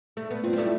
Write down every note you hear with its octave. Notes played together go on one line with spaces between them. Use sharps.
A3
B3
C4 F4
G3
A3 E4